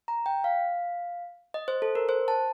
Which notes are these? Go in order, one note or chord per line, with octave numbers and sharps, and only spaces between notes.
A#5
G5
F5
D#5
C5
A4
A#4
C5
A5